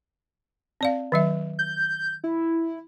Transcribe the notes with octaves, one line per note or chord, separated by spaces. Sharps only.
C4 D5 F5
D#3 F#3 E5
G6
E4